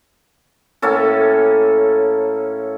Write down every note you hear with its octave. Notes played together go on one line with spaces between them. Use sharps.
A2 A#3 C#4 A4